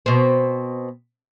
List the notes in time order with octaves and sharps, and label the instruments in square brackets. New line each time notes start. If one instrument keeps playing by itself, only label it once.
[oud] B2 C4